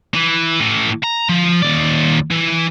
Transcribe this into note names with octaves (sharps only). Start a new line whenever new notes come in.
E3
A2 E3
A#5
F3
D#2 D5
E3